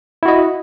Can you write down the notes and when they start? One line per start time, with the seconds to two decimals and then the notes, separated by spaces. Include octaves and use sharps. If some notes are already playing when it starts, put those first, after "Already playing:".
0.23 E4
0.25 F#4
0.28 D#5